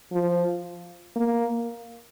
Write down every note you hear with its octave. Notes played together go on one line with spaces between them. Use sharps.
F3
A#3